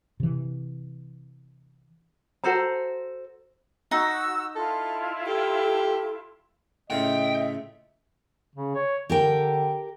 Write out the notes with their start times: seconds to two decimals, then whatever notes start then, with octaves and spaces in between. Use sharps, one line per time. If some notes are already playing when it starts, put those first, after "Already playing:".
0.20 C3 E3
2.44 F#4 A4 C5 A#5
3.91 D#4 F#4 F#5 A#5 E6
4.56 E4 F4 A4
5.27 G4 A4
6.90 A2 C#3 F4 D#5 E5 G5
8.56 C#3
8.75 C#5
9.09 D3 G4 A#4 G5